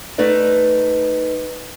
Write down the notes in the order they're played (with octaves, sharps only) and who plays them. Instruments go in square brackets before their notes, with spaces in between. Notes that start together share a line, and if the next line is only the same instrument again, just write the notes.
[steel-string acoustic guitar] A3 D#4 B4 D5